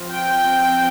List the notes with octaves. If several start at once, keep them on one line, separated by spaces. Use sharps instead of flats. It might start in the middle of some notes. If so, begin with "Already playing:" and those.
Already playing: F3 C4
G5